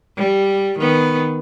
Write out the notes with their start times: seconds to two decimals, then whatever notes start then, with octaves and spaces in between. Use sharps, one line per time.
0.17 G3
0.79 D#3 B3